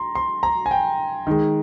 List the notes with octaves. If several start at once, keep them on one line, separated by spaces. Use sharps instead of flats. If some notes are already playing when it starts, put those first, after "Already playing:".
Already playing: A#5 C6
C6
A#5
G#5
G5
D#3 G#3